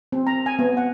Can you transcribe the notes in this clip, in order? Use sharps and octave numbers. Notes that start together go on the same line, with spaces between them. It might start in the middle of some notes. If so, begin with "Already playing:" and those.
C4
A#5
G#5
B3
F#5